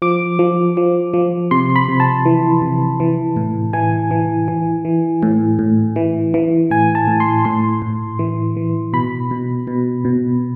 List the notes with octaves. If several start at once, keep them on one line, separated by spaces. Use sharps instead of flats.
F3 D6
F3
F3
F3
C3 C6
B5
C3
A5
E3
C3
E3
A2
E3 G#5
E3
E3
E3
A2
A2
E3
E3
A2 G#5
A5
A2
C6
A2 C6
A2
E3
E3
B2 B5
B2
B2
B2